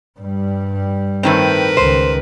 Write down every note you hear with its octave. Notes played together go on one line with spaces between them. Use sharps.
G2 G3
A2 D#3 C4 A#4 B4
C#2 D#3 C5